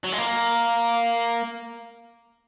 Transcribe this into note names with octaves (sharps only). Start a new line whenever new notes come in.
F#3
G#3
A#3